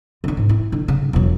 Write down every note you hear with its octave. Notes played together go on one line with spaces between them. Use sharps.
D3 C#4
G#2
E4
D3
C#3
E1 F#3